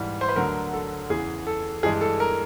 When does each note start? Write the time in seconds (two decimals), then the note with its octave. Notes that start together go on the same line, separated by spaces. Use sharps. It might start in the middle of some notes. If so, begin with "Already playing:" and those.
Already playing: G#2 E3 G3
0.21 C5
0.29 B4
0.36 D2 D3 F#3 A#4
0.73 A4
1.10 E2 C#3 E3 G#4
1.47 A4
1.83 G2 E3 G#3 G#4
2.01 A4
2.20 A#4